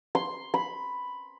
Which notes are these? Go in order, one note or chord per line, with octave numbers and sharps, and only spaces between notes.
C6
B5